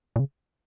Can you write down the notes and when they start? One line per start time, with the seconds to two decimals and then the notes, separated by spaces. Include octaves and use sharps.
0.16 A#2
0.20 C#3